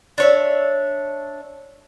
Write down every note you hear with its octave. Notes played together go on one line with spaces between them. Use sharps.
D4 C#5 E5